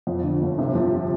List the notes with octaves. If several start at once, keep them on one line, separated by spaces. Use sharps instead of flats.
F2
D3
G1
C3
F3